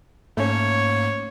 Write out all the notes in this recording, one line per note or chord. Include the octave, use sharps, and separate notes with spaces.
G#2 A3 A#3 C#4 C#5